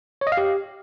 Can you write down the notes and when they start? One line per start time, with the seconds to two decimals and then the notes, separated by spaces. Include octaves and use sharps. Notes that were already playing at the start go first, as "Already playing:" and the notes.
0.21 C#5
0.27 D#5
0.32 F5
0.37 G4